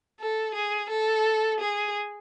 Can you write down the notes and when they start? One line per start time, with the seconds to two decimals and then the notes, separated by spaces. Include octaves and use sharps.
0.20 A4
0.55 G#4
0.90 A4
1.60 G#4